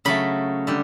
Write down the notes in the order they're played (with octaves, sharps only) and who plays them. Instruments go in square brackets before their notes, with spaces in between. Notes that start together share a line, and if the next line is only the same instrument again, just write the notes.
[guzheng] C#3 F#3 A3 B5
D3 G3